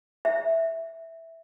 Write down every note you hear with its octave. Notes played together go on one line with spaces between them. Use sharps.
E5